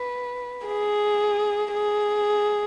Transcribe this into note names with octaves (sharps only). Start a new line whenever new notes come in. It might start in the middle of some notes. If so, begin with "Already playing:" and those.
Already playing: B4
G#4
G#4